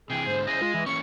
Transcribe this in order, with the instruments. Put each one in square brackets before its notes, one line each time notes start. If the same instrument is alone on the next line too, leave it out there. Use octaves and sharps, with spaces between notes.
[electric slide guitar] C3 E3 [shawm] G#4 [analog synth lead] G5
[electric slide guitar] G#2 D3 [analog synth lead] C5
[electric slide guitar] C#4 E4 G#4 [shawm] D#5
[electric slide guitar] G#3 [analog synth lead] F4
[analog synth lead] E3
[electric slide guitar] E3 A#3 C#4 [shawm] C#6 [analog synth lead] C#7